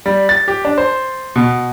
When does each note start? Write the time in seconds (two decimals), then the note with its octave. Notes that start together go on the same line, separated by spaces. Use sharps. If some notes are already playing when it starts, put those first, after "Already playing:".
0.06 G3
0.29 A6
0.48 G4
0.65 D4
0.78 C5
1.36 B2